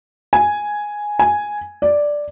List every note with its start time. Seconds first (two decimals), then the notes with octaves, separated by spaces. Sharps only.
0.33 G#5
1.19 G#5
1.82 D5